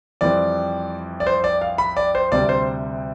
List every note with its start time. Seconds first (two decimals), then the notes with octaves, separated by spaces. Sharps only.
0.21 F2 E3 G3 C4 D5
1.20 D5
1.27 C5
1.44 D5
1.61 F5
1.78 B5
1.97 D5
2.15 C5
2.32 D2 C3 G3 C4 D5
2.49 C5